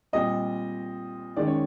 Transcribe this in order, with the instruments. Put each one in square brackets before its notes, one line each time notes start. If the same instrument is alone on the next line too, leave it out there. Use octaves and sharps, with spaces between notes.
[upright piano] A#2 G3 C4 D#5
D#3 G#3 C#4 D5
C#5